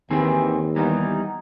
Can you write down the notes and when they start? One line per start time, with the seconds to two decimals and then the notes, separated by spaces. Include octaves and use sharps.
0.11 D#2 D#3 E3 C4 G#4
0.76 E3 G3 B3 D#4